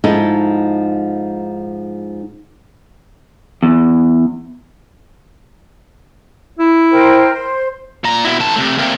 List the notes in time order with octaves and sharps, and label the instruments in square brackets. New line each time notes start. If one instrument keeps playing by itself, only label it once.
[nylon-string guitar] G#2 F3 D#4 E4 G#4 A4
[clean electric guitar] E2
[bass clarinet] E4
[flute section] A#4 C5 G5
C5
[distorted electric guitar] A#2 A#5
B2 E4
D#3 A5
C3 A3
C3 A#3